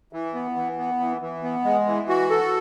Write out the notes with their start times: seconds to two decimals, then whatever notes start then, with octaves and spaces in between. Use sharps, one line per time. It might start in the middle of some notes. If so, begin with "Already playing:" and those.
0.13 E3
0.34 B3
0.56 E3
0.78 B3
1.00 E3
1.21 E3
1.43 B3
1.64 G#3
1.86 E3
2.09 F#4
2.30 A4